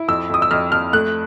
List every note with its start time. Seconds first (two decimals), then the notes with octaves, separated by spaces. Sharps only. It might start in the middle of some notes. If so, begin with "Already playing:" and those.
Already playing: E4
0.08 F2 E6
0.30 F2 D#6
0.42 E6
0.51 F2 F6
0.72 F2 F6
0.93 A3 F#6